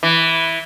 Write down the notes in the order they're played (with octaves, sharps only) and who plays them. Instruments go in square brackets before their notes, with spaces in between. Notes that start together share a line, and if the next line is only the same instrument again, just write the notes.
[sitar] E3